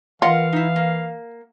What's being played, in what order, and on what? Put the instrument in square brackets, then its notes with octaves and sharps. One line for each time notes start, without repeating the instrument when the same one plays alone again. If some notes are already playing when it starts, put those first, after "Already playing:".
[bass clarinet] E3 [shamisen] F4 [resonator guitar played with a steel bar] A#4 D#5 F#5 [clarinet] F5
[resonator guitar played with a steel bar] D#4 E4
A#3